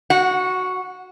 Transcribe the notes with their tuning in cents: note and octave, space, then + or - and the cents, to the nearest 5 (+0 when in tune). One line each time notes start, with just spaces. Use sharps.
F#4 +0 F#5 -20